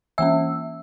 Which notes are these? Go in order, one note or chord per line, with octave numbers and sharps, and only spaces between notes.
E3 A#3 C#4 E5 E6